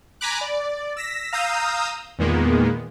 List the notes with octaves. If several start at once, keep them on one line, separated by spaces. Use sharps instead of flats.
G#5 A#5 B5 D6 F#6
D5
E6 A#6 B6
F5 A#5 D#6 E6 G6
E2 A#2 D#3 G#3 A#3 B3